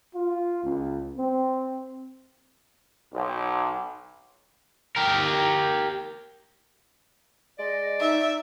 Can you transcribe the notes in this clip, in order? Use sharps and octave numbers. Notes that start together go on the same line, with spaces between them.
F4
C#2
C4
B1
G4 A#4
G#3 D5 D#5
D#4 E5